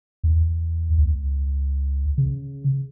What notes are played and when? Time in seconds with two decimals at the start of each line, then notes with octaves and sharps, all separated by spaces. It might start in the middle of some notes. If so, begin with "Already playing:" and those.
0.24 E2
0.98 C#2
2.18 C#3